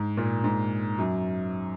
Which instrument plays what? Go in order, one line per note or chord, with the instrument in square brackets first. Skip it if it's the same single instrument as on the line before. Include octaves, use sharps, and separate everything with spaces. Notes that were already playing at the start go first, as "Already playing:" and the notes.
Already playing: [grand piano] G#2
A#2
G#2
F#2